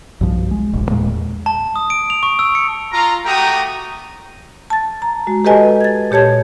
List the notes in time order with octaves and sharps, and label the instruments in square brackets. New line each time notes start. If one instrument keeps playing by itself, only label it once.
[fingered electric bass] B1 G2 F3
G#3
E1 A#1
E2 A#2 G#3
[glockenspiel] A5
D#6
D7
F7
C#6
E6
C#7
[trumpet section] F4 A#5
A3 F#4 G4 G5 A#5 D#6
[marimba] A5 A6
A#5
G#3 F#4
G4 A4 B4 D#5 G#5 A5
G#6 A6
A#2 G4 C#5 A5 G#6